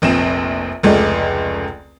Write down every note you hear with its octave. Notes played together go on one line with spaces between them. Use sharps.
F1 A#1 C4 E7
F1 C#2 G#3 A3 D5